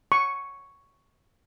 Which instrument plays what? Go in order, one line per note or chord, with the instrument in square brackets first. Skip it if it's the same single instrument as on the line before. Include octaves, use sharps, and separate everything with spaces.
[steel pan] C#6